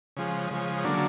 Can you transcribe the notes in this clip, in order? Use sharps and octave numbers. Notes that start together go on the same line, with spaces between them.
C#3 F3 G#3
C#3 F3 G#3
D3 F#3 A#3 D4